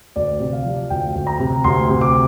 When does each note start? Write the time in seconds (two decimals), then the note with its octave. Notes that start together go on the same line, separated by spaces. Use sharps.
0.16 D2 D5
0.40 C3
0.53 F5
0.65 F3
0.90 D2 G5
1.15 D2
1.27 A#5
1.40 C3
1.64 D2 C6
1.89 C3
2.01 D6